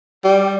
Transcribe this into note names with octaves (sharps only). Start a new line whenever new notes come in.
G3